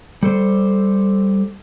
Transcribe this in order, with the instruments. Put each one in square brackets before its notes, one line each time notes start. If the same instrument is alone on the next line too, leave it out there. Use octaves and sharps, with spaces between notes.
[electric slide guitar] G3 A4 C5